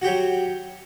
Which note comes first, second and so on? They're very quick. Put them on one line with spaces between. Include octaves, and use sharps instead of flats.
F#4 G4 F#3